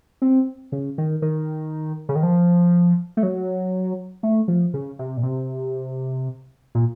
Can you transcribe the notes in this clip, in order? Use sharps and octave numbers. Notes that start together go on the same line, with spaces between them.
C4
C#3
D#3
D#3
C#3
D#3
F3
A3
F#3
A3
F3
C#3
C3
A#2
C3
A#2